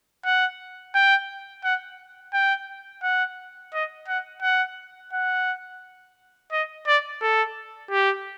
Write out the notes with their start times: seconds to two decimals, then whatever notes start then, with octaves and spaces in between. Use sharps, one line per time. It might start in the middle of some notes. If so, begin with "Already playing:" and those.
0.25 F#5
0.95 G5
1.64 F#5
2.33 G5
3.03 F#5
3.74 D#5
4.08 F#5
4.42 F#5
5.13 F#5
6.52 D#5
6.87 D5
7.22 A4
7.91 G4